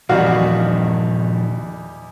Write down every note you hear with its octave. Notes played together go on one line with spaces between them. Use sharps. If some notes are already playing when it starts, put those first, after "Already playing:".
E2 A#2 D#3 F3 G3 D#4 F#4 F5